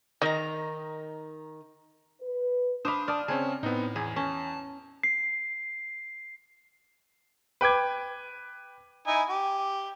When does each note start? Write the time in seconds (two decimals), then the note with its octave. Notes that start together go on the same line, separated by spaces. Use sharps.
0.22 D#3 D#4 A#4 D#5 A#5
2.22 B4
2.85 D4 C5 F5 B5 D6 D#6
3.08 D5 A5 D#6 F6
3.28 C#3 C4 C#4 G#4 A5
3.63 A2 B3 C4 D#4
3.96 E2 G#4
4.16 C#4 A5
5.03 C7
7.61 B4 G5 D6 G#6
9.07 D#4 E4 G#5
9.29 G4